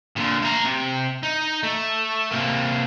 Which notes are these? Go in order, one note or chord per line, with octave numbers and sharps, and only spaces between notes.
A#2 D3
A3 A#5
C3
D#4
A3
C3 A#3